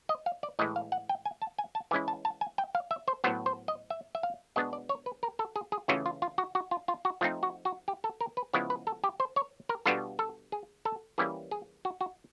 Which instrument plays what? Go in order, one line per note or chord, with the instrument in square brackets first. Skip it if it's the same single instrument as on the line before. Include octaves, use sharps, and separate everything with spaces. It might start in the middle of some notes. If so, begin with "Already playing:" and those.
[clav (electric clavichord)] D#5
F5
D5
A2 E3 G#3 D#5
F5
F#5
G5
G#5
A5
G#5
A5
E3 G#3 C#4 E4 G#5
A5
A5
G#5
G5
F5
E5
C5
A2 F#3 B3 C5
C5
D#5
E5
E5
F5
B2 G#3 B3 D4 D#5
D5
C#5
B4
A#4
A4
G#4
G#4
C#3 E3 A3 C#4 F4 F#4
F4
F4
F#4
F#4
F4
F4
F#4
F3 A3 C4 D#4 F4
F#4
F#4
G4
A4
A#4
B4
C#3 F3 G#3 B3 E4 C#5
B4
A4
G4
C5
C#5
A#4
B2 G3 B3 D4 F4 A4
A4
G#4
A4
E3 G3 A#3 C#4 E4 G#4
G#4
F#4
F#4